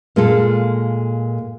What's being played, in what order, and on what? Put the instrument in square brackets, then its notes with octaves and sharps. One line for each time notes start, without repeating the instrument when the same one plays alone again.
[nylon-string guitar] A#2 G#3 F4 A4